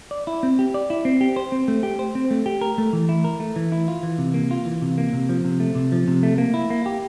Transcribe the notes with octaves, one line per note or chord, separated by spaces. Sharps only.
D5
E4
C4
G4
D5
E4
C4
G4
C5
C4
A3
G4
C5
C4
A3
G4
A#4
A3
E3
E4
A#4
A3
E3
E4
F4
E3
C3
A#3
F4
E3
C3
A#3
C3
F3
C3
A3
C3
F3
C3
A3
A#3
E4
A#3
G4